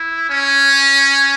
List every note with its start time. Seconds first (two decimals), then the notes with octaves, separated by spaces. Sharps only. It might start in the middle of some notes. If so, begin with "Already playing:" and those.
Already playing: E4
0.30 C#4